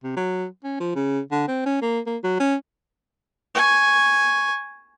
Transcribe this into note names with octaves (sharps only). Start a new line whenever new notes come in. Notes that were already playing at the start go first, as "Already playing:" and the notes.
C3
F#3
C#4
F3
C#3
D3
C4
C#4
A#3
A#3
F#3
C#4
G#5 C#6